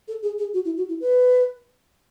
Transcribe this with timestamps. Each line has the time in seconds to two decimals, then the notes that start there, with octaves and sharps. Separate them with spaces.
0.08 A4
0.23 G#4
0.39 G#4
0.53 F#4
0.65 E4
0.77 F#4
0.89 E4
1.00 B4